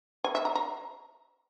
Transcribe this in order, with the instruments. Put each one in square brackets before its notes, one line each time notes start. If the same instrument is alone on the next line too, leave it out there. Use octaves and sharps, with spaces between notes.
[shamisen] G#5
E5
A#5
A#5